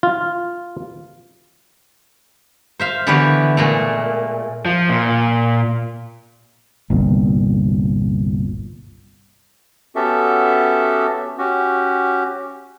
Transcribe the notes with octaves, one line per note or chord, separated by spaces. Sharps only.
F4
C5 E5 F5
D3 E3 B3 G4 C#5
A#2 G#3 A3
F3
A#2
G1 C2 A#2
B3 C#4 F#4 G4 A4 E5
C#4 F#4 G4